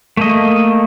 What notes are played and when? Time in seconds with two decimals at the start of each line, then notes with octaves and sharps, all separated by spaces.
0.17 A3 A#3 D#5